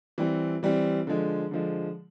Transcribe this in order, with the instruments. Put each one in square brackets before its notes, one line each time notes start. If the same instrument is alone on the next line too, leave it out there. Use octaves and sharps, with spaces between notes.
[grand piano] E3 G3 C4
E3 G3 C4
D3 F3 G#3
D3 F3 G#3